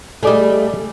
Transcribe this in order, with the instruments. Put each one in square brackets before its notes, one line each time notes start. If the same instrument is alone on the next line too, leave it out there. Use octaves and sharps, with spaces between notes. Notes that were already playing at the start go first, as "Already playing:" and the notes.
[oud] G3 A3 [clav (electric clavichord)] G#4 D5 D#5